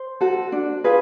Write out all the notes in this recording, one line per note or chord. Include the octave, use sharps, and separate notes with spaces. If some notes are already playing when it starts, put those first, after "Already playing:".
Already playing: C5
F#4 A4
D4
F4 G#4 B4